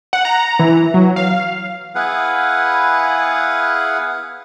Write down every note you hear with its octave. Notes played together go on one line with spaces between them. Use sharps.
F#5
A#5
E3
F#3
F5
B3 E4 G#4 B4 F5 F#5